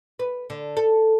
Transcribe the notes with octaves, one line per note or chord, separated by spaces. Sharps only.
B4
D3
A4